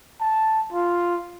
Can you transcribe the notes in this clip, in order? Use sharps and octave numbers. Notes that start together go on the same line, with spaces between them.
A5
F4